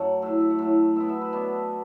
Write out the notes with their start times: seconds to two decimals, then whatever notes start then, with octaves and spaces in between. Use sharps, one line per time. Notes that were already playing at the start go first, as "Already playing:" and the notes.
Already playing: F#2 F#3 A3 F#5
0.22 A2 A3 E5
0.41 E5
0.50 F#5
0.59 A2 A3
0.96 B2 B3 E5
1.09 E5
1.21 B4
1.33 B2 B3 D4